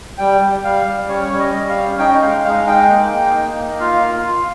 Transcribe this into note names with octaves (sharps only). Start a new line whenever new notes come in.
G3 G5
G3
G3 F5
G3
C#4 C#5
G3 C#5
D#5
G3
F5
C#4
D#4 G5
G#3 F5
G#3 F5
D#4 G5
A#3
D#4
D#4
A#3
F4 F5
F4
F4